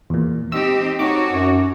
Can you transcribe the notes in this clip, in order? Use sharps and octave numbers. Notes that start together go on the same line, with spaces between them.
E2 A#2
C4 D#4 G4 E6
D#4 F#4 A4 C#5 D6
F#2